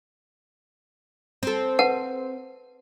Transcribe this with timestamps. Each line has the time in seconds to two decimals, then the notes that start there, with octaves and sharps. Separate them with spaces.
1.43 C4 A4
1.79 B4 F#5 A5